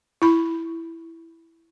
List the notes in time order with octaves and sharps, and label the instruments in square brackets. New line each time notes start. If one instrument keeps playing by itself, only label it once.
[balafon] E4 B5